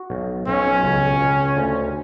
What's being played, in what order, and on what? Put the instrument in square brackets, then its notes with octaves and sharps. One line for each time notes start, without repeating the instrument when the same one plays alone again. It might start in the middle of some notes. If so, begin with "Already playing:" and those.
Already playing: [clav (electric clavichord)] F#4
B1
[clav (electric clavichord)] B1 [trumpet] C#4
[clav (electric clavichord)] C#2
C#2
D2